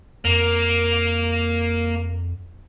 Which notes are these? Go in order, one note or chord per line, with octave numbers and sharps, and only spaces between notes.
F2 A#3